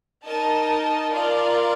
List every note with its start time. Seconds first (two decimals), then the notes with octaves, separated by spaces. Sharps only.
0.24 D#4 A#4 D#5 A5
1.09 F4 A#4 D5 F5